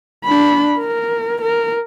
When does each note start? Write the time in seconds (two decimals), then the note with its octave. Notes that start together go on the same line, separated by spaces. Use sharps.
0.25 D4 B5
0.78 A#4
1.41 A#4